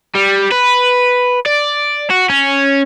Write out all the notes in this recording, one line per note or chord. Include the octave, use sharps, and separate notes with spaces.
G3
B4
D5
F#4
C#4